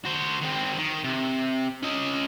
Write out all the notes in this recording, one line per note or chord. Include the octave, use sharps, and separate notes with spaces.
F#4 C5
D#3 C4
D#3
C3
C#4 D#5